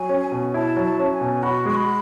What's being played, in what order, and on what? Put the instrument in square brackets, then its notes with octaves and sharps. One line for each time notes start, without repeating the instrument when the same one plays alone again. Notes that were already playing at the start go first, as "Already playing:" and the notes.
Already playing: [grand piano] F#3 [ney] G#5
[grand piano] C#4
B2
[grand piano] E4 [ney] A5
[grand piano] F#3
[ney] A5
[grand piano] C#4
[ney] G#5
[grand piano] B2
[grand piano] F#4 [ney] B5
[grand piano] G#3 [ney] C#6
[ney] B5